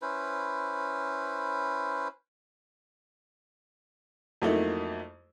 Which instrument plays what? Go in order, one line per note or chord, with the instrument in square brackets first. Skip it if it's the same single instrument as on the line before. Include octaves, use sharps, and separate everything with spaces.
[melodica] C#4 E4 B4 C5
[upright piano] F2 F#3 A3 A#3 D#4 E4